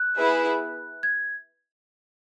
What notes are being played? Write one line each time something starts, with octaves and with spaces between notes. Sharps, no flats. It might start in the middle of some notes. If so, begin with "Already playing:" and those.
Already playing: F#6
B3 E4 G#4 B4 E5
G#6